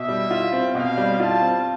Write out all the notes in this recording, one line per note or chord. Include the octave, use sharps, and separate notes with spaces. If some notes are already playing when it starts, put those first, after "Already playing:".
Already playing: B2 E5
G3
F4
C4
B2 F5
G3
F4 A5
C4